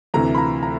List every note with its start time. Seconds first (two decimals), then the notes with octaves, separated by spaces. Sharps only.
0.14 D2 C3 E3 A#5
0.35 B5
0.38 A#5
0.63 A#5